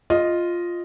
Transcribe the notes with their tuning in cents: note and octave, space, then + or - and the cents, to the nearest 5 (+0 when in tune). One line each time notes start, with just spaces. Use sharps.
F4 +0 D#5 +0